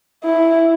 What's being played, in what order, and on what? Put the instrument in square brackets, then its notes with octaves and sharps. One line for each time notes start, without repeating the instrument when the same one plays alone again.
[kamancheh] E4